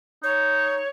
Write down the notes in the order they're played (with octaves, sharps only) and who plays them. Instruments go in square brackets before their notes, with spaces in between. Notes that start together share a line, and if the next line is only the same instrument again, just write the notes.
[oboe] D#4 [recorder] C#5